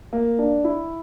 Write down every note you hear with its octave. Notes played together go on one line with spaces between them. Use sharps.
A#3
D4
E4